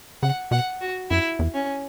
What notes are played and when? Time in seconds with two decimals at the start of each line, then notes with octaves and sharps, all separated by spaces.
0.23 C#3 F#5
0.51 B2 F#5
0.81 F#4
1.10 F#2 E4
1.39 E2
1.54 C#4